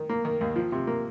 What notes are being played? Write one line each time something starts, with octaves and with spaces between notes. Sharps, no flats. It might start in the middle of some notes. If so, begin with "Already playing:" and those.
Already playing: D#3
A#3
D#3
D#2
F3
C3
A#3